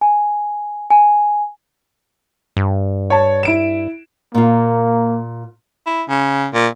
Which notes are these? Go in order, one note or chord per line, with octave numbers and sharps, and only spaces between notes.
G#5
G#5
G2
C#5 A5
E4 D7 E7
A#2 A#3 F4
E4
C#3
A#2